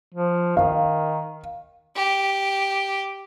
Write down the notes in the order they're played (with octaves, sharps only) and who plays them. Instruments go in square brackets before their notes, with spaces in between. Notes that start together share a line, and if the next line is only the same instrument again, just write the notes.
[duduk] F3
[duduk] D#3 [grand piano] F5
[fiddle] G4